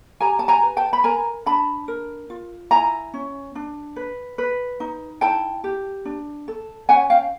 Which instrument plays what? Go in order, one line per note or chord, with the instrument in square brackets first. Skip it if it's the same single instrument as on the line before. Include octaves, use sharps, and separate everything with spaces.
[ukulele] G4 G#5 A#5
A5
G#5 A#5
B4
G5 A5
B5
A#4 G#5 A#5
D4 A5 B5
A#4
F4
E4 G#5 A#5
C#4
D4
B4
B4
D#4
E4 G5 A5
G4
D4
A4
C#4 F#5 G#5
F5 G5